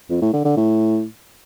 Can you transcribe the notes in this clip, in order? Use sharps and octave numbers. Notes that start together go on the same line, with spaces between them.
F2
A2
D3
D3
A2